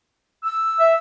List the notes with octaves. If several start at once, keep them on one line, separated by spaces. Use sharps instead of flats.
E6
E5